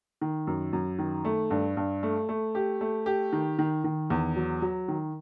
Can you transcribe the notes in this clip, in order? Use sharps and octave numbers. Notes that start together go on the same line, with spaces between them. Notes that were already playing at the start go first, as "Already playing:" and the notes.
D#3
F#2
F#2
D#3
A3
G2
G2
A3
A3
G4
A3
G4
D#3
D#3
D#3
E2
F#3
F#3
D#3